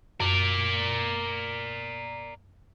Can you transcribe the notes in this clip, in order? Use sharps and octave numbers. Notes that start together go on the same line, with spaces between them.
F#2 A#4 D5